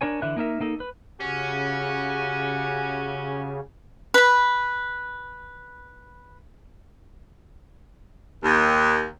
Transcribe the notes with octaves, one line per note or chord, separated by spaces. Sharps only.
D4 A#4 C#5 G#5
D3 E3 E5 F#6
A#3 D#4 A#4 E5
A#3 D#4 A4
B4
C#3 C#4 F#4 G4 G#5
B4 B5
D#2